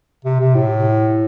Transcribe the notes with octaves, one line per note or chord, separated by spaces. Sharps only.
C3
C3
A2